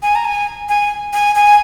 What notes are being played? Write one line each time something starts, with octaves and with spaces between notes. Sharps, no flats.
G#5
A#5
G#5
G#5
G#5
G#5